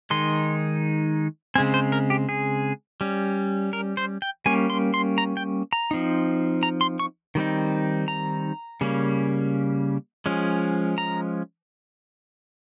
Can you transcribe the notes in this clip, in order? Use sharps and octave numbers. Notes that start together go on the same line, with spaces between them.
D#3 G#3 D#4 C6
C#3 G#3 C4 G#5
C5
A#4
G4
G#4
G3 C#4
A#4
C5
G5
G3 A#3 C#4 G#5
C6
C6
A#5
G5
A#5
F3 C4 D#4
A#5
C6
C#6
D#3 G3 C4 D#4
A#5
C#3 G3 A#3 C#4
F3 G#3 C#4
A#5